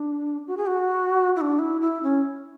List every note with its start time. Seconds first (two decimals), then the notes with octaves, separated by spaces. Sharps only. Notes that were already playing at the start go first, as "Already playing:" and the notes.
Already playing: D4
0.47 F#4
0.57 G#4
0.66 F#4
1.36 E4
1.41 D4
1.59 E4
1.81 E4
2.03 C#4